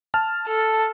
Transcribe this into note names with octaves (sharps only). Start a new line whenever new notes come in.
A5 F6
A4